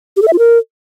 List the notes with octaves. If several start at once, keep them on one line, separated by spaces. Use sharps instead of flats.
G4
A4
E5
F4
A#4